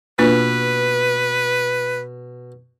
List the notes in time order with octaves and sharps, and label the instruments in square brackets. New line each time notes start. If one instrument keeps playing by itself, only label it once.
[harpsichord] B2 [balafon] A#3 D4 F4 [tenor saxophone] B4